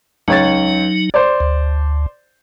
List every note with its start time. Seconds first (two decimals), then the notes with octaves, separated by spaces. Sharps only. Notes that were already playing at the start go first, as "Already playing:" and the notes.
0.28 C#2 F#3 D#4 C#5 A6
1.14 C5 D5
1.40 D2